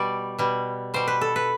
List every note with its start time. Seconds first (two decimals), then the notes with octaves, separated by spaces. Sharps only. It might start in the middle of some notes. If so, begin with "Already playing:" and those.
Already playing: B2 G3 D5
0.38 B2 G3
0.94 B2 G3 C5
1.07 B4
1.21 A4
1.36 B4